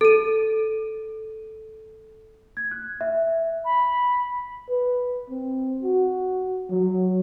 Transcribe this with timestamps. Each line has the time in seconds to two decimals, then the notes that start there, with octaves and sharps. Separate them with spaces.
0.01 A4 D#7
2.57 G#6
2.71 F#6
3.01 E5
3.64 B5
4.69 B4
5.29 C4
5.83 F#4
6.70 F#3